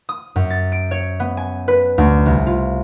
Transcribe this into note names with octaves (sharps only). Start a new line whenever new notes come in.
D#6
F#2
A6
D7
C#5
B3
G#5
B4
D2
C2
F4